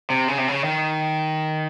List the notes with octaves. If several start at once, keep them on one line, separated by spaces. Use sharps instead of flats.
C3
C#3
C3
C#3
D#3